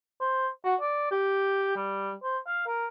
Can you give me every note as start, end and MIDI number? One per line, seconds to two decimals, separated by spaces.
0.20 0.48 72
0.64 0.75 66
0.81 1.11 74
1.11 1.72 67
1.76 2.13 55
2.23 2.38 72
2.47 2.66 77
2.67 2.87 70